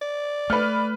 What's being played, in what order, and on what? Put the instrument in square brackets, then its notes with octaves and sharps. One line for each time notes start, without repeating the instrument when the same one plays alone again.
[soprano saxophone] D5
[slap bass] A3 [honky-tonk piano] B4 F6